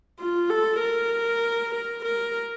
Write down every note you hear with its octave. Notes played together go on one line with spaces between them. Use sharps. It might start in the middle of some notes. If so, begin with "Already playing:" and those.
F4
A4
A#4
A#4
A#4